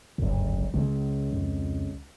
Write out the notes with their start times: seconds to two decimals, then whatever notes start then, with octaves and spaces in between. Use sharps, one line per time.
0.18 F#1 D2 G2
0.57 A#1
0.74 C#2 C#3
1.33 F2